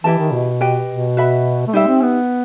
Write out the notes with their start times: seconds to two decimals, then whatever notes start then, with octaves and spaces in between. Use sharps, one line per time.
0.04 E3 E4 G4 D#5 A5
0.18 D#3
0.32 B2
0.61 G4 B4 D#5 G5
0.89 B2
1.17 F#4 B4 E5 B5
1.67 A3
1.73 G3 D#4 G4 C5 E5
1.87 C4
2.02 B3